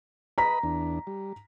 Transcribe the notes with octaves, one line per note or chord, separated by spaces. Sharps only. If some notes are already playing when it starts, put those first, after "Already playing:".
B4 D#5 A#5 B5 B6
E2 D4
G3